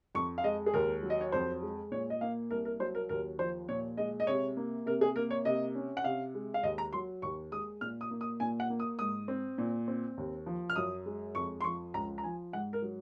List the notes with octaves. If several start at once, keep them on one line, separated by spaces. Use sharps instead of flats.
F2 C#6
F5
G#3 D#5
G#4
D#2 A#4
F#3
D#5
C#5
F2 C5
G#3
A#2 C#5
D#5
A#3 F5
C2 A#4
A#4
F#3 C5
A#4
D#2 A#4
F3 C5
A#2 C#5
G#3 D#5
D#5
C3 C#5
A#3
C3 A#4
G#4
A#3 A#4
C#5
C3 D#5
C#4
F#5
C3 F5
G#3
F5
D#2 D#5
A#5
F#3 C6
D#2 C#6
G#3 D#6
A#2 F6
D#6
A#3
D#6
A#2 G#5
F#5
A#3
D#6
G#2 D#6
C4
A#2
C4
D#2
F3
F6
F#2 D#6
G#3
F2 C#6
C6
F3 C#6
C#2 A#5
A#5
F3 G#5
G#2 F#5
A#4
F#3